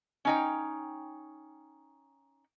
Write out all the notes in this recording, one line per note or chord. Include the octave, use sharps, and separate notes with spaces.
C#4 D#4 G5